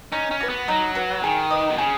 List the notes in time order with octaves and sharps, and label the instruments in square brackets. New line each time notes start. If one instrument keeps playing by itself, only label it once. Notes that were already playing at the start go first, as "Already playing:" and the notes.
[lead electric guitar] C#4 [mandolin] D#4
[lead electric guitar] C#4
[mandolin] F#4 B4
[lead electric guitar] B3
[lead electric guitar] F#3 [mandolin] D#4
[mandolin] F#4 B4
[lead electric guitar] D#3 [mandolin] G#4
[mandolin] B4 D#5
[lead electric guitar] B2
[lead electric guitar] C#3 [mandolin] G#4